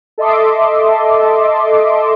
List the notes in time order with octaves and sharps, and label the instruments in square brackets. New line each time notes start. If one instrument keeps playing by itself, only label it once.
[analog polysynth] A4 D#5 E5 C6 D6